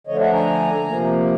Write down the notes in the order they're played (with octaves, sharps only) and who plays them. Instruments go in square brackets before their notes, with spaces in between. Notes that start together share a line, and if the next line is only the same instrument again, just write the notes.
[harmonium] D3 F3 A3 D4 C#5 D#5
E5 F#5
G#5 A#5
C3 F3 A#3